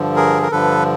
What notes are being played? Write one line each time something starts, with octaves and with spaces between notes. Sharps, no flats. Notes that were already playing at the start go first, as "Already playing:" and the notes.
Already playing: G2 D3 F3
G#4 A#4
A#4
G2 D3 F3 A4 B4